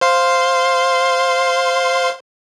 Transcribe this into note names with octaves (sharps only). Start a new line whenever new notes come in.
C5 F5 C6